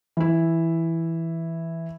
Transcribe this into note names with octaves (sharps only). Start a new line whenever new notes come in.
E3 E4